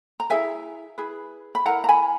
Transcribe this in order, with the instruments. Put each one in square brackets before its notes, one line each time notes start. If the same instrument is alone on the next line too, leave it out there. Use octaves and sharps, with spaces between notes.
[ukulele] A#5
E4 G#4 B4 E5 G#5
E4 G#4 B4
B5
E4 A#4 F#5 A#5
A#5
G#5 B5